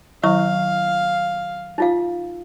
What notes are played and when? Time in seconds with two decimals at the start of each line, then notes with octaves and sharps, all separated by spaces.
0.23 D#3 F#3 E4 F5 C#6
1.78 D#4 F4 F5